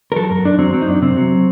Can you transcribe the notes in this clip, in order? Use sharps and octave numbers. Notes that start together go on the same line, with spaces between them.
A#4
F#3 A4
F#2 A#4
F#2 D4
F#3 C4
F#3 C4
D#4
F#2 D4
C3 C4
F#3